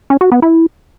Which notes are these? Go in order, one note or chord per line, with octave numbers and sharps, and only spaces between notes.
C#4
F#4
B3
E4